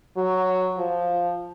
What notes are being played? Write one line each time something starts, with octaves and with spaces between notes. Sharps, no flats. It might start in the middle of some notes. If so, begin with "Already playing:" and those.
F#3
F3